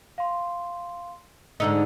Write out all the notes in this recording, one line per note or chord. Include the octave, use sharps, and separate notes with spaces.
F5 C6
G#2 D3 D#4 E6 C#7